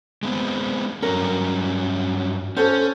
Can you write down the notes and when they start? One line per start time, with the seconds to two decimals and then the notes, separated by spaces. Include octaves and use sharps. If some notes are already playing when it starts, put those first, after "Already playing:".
0.23 G#3 B3 C4
1.02 G2 F#3 C#4 A#4
2.57 C#4 F#4 A4 C5